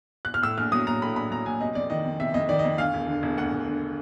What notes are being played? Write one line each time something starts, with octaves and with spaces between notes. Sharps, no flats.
F#6
F6
A2 E6
A#1 F6
F#3 D#6
A#1 A#5
A2 B5
A#1 B5
F#3 A#5
A#1 G#5
C3 D#5
F2 D5
D#3 D#5
F2
C3 E5
F2 D#5
D#3 D5
F2 D#5
D2 F5
E1
D3
E1
D2 F#5
E1
D3